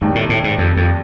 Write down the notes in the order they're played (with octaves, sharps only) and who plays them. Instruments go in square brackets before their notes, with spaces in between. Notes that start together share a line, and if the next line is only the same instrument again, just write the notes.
[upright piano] F1 D#2 D#3 [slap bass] G#2
[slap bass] A2
A2
G#2
F2
F2